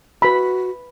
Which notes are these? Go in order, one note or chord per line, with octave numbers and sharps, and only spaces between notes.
F#4 B4 B5